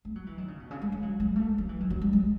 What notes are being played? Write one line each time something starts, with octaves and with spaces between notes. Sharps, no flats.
A3
F#3
E3
D#3
C#3
B2
C#3
G#3
G#3
F#3
G#3
A3
F#3
E3
D#3
F#3
G#3
G#3